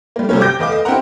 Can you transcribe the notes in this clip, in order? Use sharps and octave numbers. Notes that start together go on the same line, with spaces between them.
G3 A#3
C3 F#3 G3 A#3 C#4
G5 D6 G6 A#6 D7
E2 A3 B4 D#5 F5 D6
D#5
C4 E4 G4 A#4 F#5 A#5